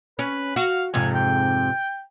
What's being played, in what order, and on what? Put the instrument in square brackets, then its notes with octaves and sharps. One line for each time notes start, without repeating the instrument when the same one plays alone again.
[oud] C#4 [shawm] B4
[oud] F#4 [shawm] F5
[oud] F2 G#2 C3 [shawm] G#5
[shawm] G5